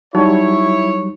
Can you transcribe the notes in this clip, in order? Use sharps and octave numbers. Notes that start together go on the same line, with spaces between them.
F#3 G3 D#4 E4 C#5